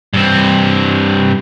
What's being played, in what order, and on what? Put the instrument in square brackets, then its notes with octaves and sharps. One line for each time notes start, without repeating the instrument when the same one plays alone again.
[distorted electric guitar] G2 C4